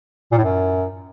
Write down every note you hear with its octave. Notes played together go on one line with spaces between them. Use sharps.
A#2
A2
F#2